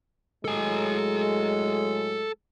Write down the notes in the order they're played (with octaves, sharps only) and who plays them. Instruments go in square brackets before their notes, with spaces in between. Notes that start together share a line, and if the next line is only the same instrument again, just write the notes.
[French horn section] A2 F#3 G#3 [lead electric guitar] A4 G#5